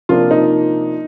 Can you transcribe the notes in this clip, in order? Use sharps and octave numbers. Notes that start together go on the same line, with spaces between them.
C3 F3 A#3 D4 F4
D#4